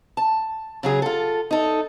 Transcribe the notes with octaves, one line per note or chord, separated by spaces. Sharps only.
A5
C#3 F#3 G#4
F4 A4
D#4 A4